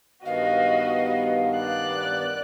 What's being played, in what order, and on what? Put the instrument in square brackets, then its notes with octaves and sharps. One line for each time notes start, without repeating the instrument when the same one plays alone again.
[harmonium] G2 D#3 B3 [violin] F#4 D#5 [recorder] F5
[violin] D5 F#6